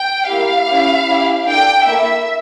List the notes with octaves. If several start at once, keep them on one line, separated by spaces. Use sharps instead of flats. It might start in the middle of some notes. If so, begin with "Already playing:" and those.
Already playing: G5
A#3 E4 G4 F5
C#4 E4 G4
C#4 E4 G4
D4 A4 G5
A#3 E4 A4 E5